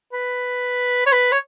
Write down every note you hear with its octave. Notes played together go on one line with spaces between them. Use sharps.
B4
C#5
B4
C#5